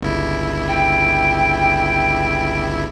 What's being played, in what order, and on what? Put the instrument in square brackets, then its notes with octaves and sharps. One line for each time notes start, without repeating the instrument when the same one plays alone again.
[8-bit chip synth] G1 C#2 E4
[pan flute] G5